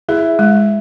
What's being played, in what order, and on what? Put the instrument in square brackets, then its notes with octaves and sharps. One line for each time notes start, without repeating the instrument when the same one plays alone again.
[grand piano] E4 [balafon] G#4
[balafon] G#3